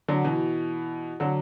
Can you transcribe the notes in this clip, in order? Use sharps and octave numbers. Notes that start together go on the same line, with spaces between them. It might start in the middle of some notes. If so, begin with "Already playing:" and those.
D3 F#3
B2 E3
D3 F#3